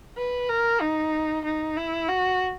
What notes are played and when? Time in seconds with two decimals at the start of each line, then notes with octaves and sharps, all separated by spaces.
0.17 B4
0.49 A#4
0.81 D#4
1.45 D#4
1.77 E4
2.09 F#4